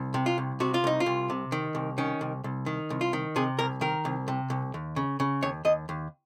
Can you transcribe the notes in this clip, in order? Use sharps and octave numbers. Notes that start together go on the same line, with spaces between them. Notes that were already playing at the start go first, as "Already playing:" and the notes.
Already playing: C2
C3
F4
C2
C3 F#4
F4
C2 D#4
F4
C2
C3
D#3
C2
D#3 C#4
C2
C2
D#3
C2
F4
D#3
C3 G#4
C2 A#4
D#3 A#4
C2
C3
C2
D#2
C#3
C#3
D#2 C#5
D#2 D#5
D#2